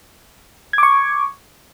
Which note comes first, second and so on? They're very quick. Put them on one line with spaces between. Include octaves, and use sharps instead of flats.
G#6 D6 C#6